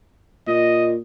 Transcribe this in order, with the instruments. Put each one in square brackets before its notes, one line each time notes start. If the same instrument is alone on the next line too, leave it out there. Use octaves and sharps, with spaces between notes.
[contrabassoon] A#2 [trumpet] D#5